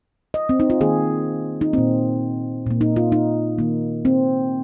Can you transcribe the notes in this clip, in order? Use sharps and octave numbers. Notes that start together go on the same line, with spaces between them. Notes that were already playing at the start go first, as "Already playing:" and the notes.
D#5
C4
D#4
F4
D#3 A#3 G#4
D#4
A#2 A#3 C4
A#2 A#3
D#4
F4
D#4
D#3 A#3
C4